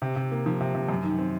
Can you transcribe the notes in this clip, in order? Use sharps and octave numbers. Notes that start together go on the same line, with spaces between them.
C3
C3
A#3
F3
C3
C3
F#2
D#3
C4